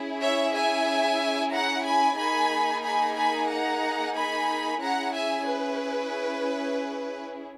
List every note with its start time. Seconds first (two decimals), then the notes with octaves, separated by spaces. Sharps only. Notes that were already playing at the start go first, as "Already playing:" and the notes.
Already playing: C#4 E4 G#4
0.20 C#5 E5
0.53 E5 G#5
1.52 F#5 A#5
1.84 G#5 B5
2.17 A#3 D#4 G#4 G#5 B5
2.83 G#5 B5
3.16 G#5 B5
3.49 F#5 A#5
4.15 G#5 B5
4.80 C#4 E4 G#4 F#5 A#5
5.13 E5 G#5
5.46 B4